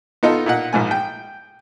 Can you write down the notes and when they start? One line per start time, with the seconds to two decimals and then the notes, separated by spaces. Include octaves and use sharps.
0.23 B3 D#4 F4 A4
0.46 A#2 D#4 F#5
0.73 A#1 G#2 G#5
0.91 G5